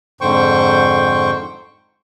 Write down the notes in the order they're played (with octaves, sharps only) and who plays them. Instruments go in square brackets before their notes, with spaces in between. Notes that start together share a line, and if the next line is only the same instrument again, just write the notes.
[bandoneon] F2 G#2 D3 C5 G5 C#6